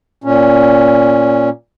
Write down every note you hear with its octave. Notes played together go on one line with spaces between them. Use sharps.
A#2 C#4